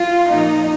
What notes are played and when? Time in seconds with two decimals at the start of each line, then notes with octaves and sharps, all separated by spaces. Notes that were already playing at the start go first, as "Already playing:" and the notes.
Already playing: F4
0.28 A#2 F3 D#4